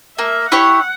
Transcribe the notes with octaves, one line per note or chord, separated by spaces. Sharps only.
A#3 E5
E4 G4 C#5 F#5